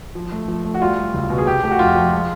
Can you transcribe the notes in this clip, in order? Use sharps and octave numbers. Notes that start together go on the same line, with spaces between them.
F3
A3
F3
A3
F#4
G3 F4
G3
C#2
B2
G#4
C3 G4
A3 G4
F#4
F2 F4
F3
G#3